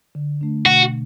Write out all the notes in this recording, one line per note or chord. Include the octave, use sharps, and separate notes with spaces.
D3
A3 D4
B2 F#4